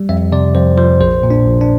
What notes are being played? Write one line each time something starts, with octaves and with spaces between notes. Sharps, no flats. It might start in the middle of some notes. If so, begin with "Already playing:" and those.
Already playing: G3
F2 E5
C3 D5
F2 C5
F3 C5
A#1 C5
A#2
D4
A#1
D4